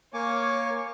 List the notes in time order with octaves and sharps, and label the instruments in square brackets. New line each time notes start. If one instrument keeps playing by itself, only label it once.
[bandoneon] A#3 [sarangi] C#5 [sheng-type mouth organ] G#5 C#6 D6